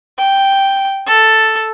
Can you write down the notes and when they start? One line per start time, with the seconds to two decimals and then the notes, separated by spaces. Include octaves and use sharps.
0.18 G5
1.07 A4